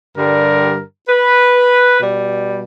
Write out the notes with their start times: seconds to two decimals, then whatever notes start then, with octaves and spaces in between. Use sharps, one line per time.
0.16 G2 D3 G3 A#4
1.08 B4
2.00 B2 G3